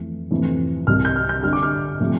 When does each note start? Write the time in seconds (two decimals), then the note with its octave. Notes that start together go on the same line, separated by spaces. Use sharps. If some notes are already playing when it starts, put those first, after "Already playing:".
Already playing: F2 E3 A3
0.31 F2 C3 E3 A3
0.87 C2 C3 G3 F6
1.05 G6
1.16 F6
1.29 G6
1.43 G2 D3 G3 F6
1.53 D6
1.63 F6
2.00 C3 F3 A3